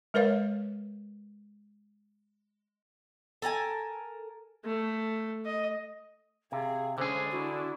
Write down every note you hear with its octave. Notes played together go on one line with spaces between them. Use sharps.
G#3 A#4 B4 C#5 F5
A4 A#4 F#5 G#5
A3
D#5
C3 G#4 F5
D3 G#3 C#4 G#4 C5
D4 E4 F#4